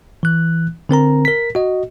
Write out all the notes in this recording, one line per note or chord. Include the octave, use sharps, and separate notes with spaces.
E3 F#6
D3 C4 A#4 A#5
A#4 B6
F#4 D#5